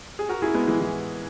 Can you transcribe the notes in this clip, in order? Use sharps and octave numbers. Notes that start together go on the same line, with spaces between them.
G#4
F#4 A#4
E4 G#4
G#3 B3
E3 G#3
E3